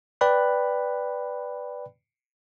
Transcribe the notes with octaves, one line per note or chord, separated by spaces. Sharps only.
B4 D5 G5 B5 F#6